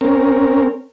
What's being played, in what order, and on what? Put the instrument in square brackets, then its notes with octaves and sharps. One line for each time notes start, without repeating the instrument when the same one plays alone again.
[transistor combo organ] C4 C#4 A#4